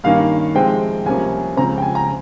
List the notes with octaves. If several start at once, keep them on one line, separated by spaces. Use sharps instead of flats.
G2 D#3 A#3 C#4 F5
C3 F3 G#3 C4 G5
C2 C3 F3 A#3 C#4 G#5
C#2 C#3 F3 C4 A#5
G5
G#5
A#5